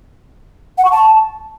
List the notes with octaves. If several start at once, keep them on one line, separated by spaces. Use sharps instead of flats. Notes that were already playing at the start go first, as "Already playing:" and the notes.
F#5
C#6
A5